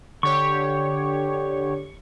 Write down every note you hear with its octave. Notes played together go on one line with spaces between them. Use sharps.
D3 G4 C#5 C#6